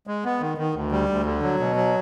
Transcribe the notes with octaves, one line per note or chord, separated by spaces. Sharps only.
G#3
B3
D#3
D#3
D2
G3
D2
D3
F#3
B2
F#3